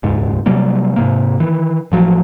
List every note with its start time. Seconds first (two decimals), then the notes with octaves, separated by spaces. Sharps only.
0.03 D#1 C#2 G#2
0.46 C3 F#3 G3 A#3
0.96 G#2 C3 A#3
1.40 D#3 E3
1.92 A1 F3 F#3